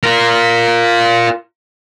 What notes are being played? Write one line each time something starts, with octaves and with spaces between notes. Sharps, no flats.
F4 A#4